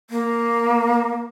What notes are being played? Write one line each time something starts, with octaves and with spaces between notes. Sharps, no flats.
A#3